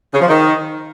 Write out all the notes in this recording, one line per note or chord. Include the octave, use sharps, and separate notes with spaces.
C#3
F3
D#3